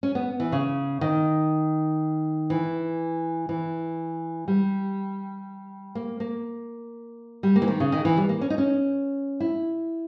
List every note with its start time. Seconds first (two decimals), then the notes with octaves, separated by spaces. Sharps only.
0.03 C#4
0.15 B3
0.40 E3
0.52 C#3
1.01 D#3
2.50 E3
3.49 E3
4.48 G3
5.95 A#3
6.20 A#3
7.43 G3
7.56 A#3
7.62 E3
7.68 D#3
7.80 C#3
7.92 D#3
8.05 E3
8.17 G3
8.29 A#3
8.41 C#4
8.50 D#4
8.58 C#4
9.40 E4